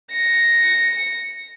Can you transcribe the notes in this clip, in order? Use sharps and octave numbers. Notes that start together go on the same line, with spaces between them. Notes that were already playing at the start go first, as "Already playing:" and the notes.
A#6 C#7